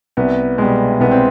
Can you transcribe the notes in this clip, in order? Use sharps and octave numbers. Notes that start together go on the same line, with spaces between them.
C2 B3
B2 G3 G#3
C2 B3
C4